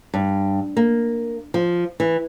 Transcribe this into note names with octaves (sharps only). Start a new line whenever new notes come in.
G2
A#3
F3
E3